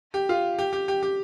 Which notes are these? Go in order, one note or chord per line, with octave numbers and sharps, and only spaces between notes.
G4
F4
G4
G4
G4
G4